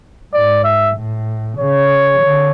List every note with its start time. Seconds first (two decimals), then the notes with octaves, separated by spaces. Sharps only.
0.34 G#2 D5
0.64 E5
0.96 A2
1.58 C#3 C#5
2.20 D3